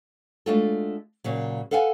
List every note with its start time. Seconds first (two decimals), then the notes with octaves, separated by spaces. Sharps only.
0.46 G#3 A3 D4 F4 F#4 A4
1.24 A#2 C#3 F#3
1.71 A4 B4 F5 F#5 G#5